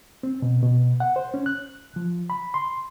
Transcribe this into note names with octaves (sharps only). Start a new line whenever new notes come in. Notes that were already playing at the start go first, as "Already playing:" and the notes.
C4
B2
B2
F#5
C5
C#4
F#6
F3
B5
C6